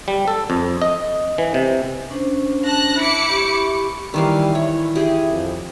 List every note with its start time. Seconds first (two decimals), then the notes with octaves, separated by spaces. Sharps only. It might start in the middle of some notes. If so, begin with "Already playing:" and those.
0.08 G3
0.28 A4
0.50 F2
0.82 D#5
1.38 E3
1.54 C3
2.10 C#4 D4 C5
2.65 A5 F#6 A#6
2.98 E4 D6 C#7
3.29 G4 B5 C#6
4.14 D#3 E3 G3 F5
4.55 E4 C#5
4.96 G4 G#4
5.31 F2